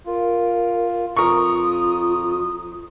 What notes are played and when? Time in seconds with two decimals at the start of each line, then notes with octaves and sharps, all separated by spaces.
0.06 F4 A#4
1.17 F2 F4 A#4 C#6 D#6